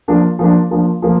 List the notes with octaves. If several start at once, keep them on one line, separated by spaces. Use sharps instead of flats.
F3 A#3 D4
F3 A#3 D4
F3 A#3 D4
F3 A#3